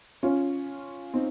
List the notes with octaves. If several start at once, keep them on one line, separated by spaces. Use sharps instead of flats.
C#4 F4
C4 D#4